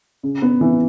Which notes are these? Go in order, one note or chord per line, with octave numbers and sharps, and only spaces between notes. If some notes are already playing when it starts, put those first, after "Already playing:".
C#3
B3
E3